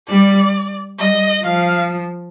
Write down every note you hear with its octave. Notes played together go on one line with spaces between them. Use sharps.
G3 D5
G3 D#5
F3 F5